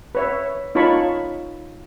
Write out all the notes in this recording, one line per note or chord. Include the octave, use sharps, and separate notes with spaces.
B4 C#5 E5
D#4 F4 C#5 A5 B5 C#6